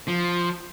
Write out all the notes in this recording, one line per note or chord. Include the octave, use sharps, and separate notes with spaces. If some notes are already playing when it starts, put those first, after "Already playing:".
F3